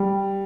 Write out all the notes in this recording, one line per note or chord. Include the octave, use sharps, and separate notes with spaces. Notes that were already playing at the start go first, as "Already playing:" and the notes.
Already playing: G3